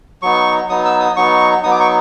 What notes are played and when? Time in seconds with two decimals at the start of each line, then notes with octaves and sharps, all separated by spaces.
0.22 F#3 B3 D#4 C#6
0.69 F#3 B3 D#4 D#6
0.85 E6
1.00 D#6
1.16 F#3 B3 D#4 C#6
1.63 F#3 B3 D#4 D#6
1.71 D6
1.80 C#6